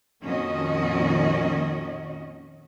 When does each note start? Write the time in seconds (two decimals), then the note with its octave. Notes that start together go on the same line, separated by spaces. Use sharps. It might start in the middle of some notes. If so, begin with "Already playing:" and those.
0.24 F2 A#2 D#3 C#4 F#4 D#5